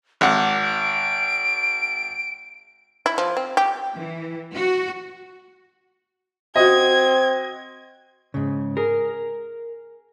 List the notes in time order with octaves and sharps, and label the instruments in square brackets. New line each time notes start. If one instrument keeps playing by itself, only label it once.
[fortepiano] G#1 F#5 [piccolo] D6
[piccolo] D7
[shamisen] E4
F3
C4
G4
[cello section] E3
F#4
[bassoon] C4 [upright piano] F#4 D#5 [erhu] G#6
[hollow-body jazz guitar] G#2 C#3
[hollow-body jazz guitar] G#4 [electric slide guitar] A#4